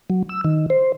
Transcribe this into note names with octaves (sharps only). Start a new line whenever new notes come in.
F#3
E6
D#3
C5